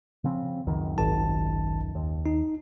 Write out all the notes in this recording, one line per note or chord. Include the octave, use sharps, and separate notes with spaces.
C#3 F3 C4
C#2 F#2 D#3
G#1 A5
D#2
D#4